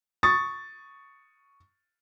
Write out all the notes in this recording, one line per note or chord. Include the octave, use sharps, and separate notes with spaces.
C#6 D#6 A6